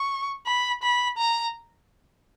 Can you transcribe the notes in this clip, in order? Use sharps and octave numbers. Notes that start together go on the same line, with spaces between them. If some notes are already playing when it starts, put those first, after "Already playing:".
Already playing: C#6
B5
B5
A#5